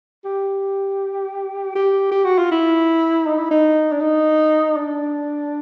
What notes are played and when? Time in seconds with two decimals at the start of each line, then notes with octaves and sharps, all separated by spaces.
0.25 G4
1.75 G4
2.11 G4
2.25 F#4
2.38 F4
2.51 E4
3.26 D#4
3.38 E4
3.51 D#4
3.92 D4
4.01 D#4
4.76 D4